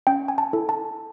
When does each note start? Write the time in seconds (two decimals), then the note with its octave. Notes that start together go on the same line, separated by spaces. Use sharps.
0.07 C#4 G5
0.28 G#5
0.38 A5
0.53 E4 A4
0.69 A5